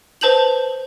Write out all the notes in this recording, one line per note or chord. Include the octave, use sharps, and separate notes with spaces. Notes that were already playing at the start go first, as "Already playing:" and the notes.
B4 C5 A5 G6 F7 F#7